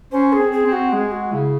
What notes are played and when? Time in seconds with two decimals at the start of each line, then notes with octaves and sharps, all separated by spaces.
0.12 C#4 C5
0.33 G#4
0.38 C4
0.52 G#4
0.66 C4
0.72 F#4
0.93 G#3 G#4
1.12 F#4
1.32 C#3 E4